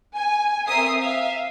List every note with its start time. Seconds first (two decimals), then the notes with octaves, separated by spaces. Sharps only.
0.15 G#5
0.67 C4 A#4 E5 D#6 C7
0.99 E5 F5